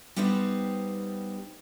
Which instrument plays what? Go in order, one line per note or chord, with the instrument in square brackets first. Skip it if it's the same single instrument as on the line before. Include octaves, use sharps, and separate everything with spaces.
[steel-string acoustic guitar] G3 B3 D#4 G4 C5